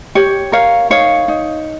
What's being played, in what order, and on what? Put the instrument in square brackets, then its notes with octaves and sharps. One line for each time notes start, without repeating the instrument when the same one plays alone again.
[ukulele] G4 C#5
A#4 C#5 F5
D#4 C#5 F5
D#4